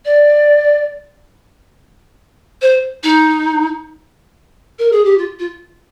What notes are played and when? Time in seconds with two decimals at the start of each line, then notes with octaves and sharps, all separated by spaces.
0.05 D5
2.61 C5
3.03 D#4
4.79 A#4
4.92 G#4
5.04 G4
5.18 F4
5.39 F4